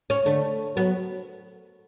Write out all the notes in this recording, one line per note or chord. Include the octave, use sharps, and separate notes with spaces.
C#4
D3 A3
F#3 B3